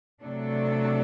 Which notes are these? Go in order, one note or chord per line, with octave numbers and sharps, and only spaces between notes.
C3 F#3 A3 D4 A4